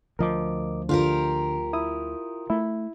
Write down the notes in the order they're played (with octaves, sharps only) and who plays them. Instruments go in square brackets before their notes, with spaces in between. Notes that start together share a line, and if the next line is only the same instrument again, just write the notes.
[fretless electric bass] D2 F3 [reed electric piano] A#4 D#5 D6
[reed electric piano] D3 [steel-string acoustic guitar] F4 G4 A#4
[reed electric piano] E4 D#6
[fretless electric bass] A3 [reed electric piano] E4